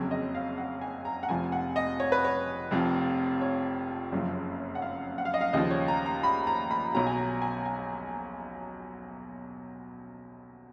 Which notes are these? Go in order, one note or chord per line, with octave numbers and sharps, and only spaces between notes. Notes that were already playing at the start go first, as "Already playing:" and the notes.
Already playing: F#1 F2 C#3 F#3 C#5
D#5
F5
F#5
G#5
A#5
F#5
F1 F2 F3 G#5
F#5
D#5
C#5
B4
C#5
F1 F2 F3
C#5
F#1 F#2 F3
F#5
F5
F#5
F5
D#5
F5
D#2 C#3 F3 D#5
C#5
A#5
A#5
B5
A#5
B5
B1 B2 F#3 A#5
G#5
A#5
G#5
G#5